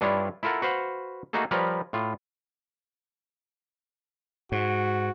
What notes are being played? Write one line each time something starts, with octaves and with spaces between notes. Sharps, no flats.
G2 D4 E4 F4 C#5
E4 F4 A4 A#4 F#5
F#4 B4 C5 F5 F#5
A3 A#3 D#4 F#4 G#4 A4
F3 G3 A#4 B4 C#5
A2 F4
G#2 F#4